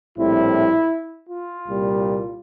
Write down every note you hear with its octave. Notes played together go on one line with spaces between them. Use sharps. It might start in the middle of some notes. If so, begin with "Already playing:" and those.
A#1 A2 G3 C4 E4
F4
C2 A#2 G3